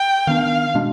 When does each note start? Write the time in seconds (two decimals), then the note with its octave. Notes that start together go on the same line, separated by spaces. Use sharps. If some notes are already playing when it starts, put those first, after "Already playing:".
Already playing: G5
0.27 D#3 B3 D4 F5
0.75 B2 G#3 D4